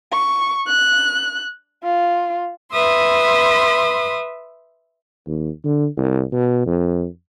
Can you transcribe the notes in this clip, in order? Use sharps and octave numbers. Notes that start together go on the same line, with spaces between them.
C#6
F#6
F4
B4 E5 C6 D#6
D#2
D3
C2
B2
F2